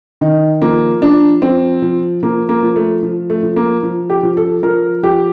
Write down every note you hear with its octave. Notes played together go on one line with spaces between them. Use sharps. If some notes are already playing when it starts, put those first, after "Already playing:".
D#3 D#4
F3 A#3
F3 D4
F3 C4
F3
F3 A#3
A#3
F3
A3
F3
A3
F3
A#3
F3
G4
F3
A4
F3 A#4
F3 G4